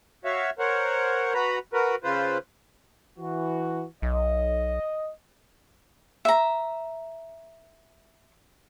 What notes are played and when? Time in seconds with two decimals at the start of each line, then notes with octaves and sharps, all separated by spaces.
0.25 F#4 C#5 E5 F5
0.59 A#4 C5 C#5 F#5
1.34 F#4 B4 A#5 B5
1.73 F#4 A#4 B4
2.04 C#3 F4 B4 C5
3.19 E3 F#4
4.02 B1 D#5
6.25 E5 A#5